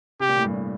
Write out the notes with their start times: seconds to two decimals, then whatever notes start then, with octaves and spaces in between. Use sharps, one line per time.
0.20 C3 G4
0.29 A#2
0.37 A2
0.44 G2
0.54 A2